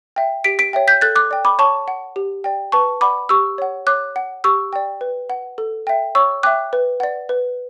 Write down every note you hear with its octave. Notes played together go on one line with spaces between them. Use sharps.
E5 G5
G4 B6 D7
B6 D7
C#5 E5 G5
G6 B6
A4 F#6 A6
D6 F#6
D5 G5
B5 D6
C#5 A5 C#6
F#5
G4
D5 G5
B4 A5 C#6
D5 F#5 B5 D6
G4 C#6 E6
C#5 F#5
C#5 D6 F#6
F#5
G4 C#6 E6
D5 G5
B4
F#5
A4
E5 G5
C#5 C#6 E6
E5 G5 D6 F#6
B4
D5 F#5
B4